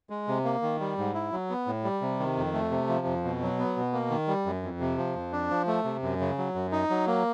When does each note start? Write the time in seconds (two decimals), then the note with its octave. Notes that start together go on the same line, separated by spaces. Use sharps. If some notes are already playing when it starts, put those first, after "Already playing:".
0.10 G#3
0.28 C3
0.45 A#3
0.62 D#3
0.80 G3
0.98 G#2
1.14 E4
1.32 F#3
1.50 B3
1.67 A2
1.84 G3
2.01 C3
2.20 D#3
2.37 F2
2.54 A3
2.71 C3
2.89 F3
3.06 F2
3.24 B2
3.42 F#3
3.59 B3
3.76 B2
3.93 A#3
4.10 D#3
4.28 G3
4.46 F#2
4.63 F2
4.81 C3
4.98 F3
5.15 F2
5.32 D4
5.50 F3
5.67 A3
5.85 C3
6.02 F#2
6.20 C#3
6.38 F#3
6.55 F#2
6.72 D#4
6.90 F#3
7.07 A#3